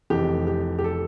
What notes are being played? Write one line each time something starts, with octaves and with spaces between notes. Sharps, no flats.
F1 F2 E3 G4
G4
G4
A4